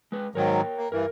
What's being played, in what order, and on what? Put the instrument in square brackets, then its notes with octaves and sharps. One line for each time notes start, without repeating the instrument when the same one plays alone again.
[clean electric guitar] G#3 B4
[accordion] G#2 D#3 F#3 [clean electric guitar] A#4 C#5 G5
[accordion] A#3
[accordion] G2 E3 [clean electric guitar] A#4